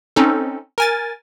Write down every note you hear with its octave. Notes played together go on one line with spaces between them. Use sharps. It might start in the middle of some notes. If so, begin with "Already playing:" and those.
C4 C#4 D#4 A4
A#4 G#5 A6